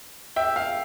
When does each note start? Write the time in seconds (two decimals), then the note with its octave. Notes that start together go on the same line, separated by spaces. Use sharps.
0.36 E5 G5
0.56 F5